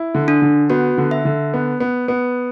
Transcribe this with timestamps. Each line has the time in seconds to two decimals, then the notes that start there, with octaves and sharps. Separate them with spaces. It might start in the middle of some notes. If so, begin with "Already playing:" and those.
Already playing: E4
0.15 D3
0.28 D4
0.42 D3
0.70 B3 F#4
0.98 D3
1.11 E5
1.25 D3
1.54 B3
1.80 B3
2.08 B3